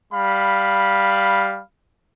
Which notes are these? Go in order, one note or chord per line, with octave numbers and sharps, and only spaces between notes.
G3 F5 B5